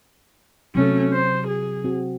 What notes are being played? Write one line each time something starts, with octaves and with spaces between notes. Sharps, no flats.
C3 F#3 A3 C#4
C5
G#4
C4 F#4